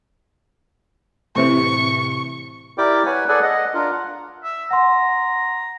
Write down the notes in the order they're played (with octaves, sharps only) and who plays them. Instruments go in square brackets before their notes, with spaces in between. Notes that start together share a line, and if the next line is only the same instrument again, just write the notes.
[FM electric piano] A2 C3 E3 [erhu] C#6
[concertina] E4 G4 A#4 D5 G5 D6
B4 C#5 F#5 G#5
G#4 A4 B4 D5 F#5 G#5
D#5 F#5
D4 F4 A#4
F#5
[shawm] E5
[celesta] F#5 C6 [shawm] A#5